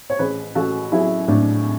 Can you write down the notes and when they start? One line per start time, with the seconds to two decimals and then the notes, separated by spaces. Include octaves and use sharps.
0.10 C#5
0.19 A1 G#4 B4
0.55 A1 F#4 A4
0.92 F#3 E4 G#4
1.28 A2 D4